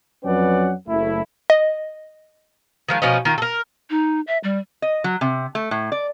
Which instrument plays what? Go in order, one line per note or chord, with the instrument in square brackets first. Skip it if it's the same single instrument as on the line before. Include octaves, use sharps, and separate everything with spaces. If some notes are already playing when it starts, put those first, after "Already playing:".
[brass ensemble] F2 F#3 C#4 B4 D5 F#5
F#1 A3 E4
[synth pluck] D#5
[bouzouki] D#3 F3 G#3
B2 F3 C#4 D#4
D#3 F4 A#4
A4 A#4
[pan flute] D#4
E5
G3
[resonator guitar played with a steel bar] D#5
F#3
C3
A3
A2
D5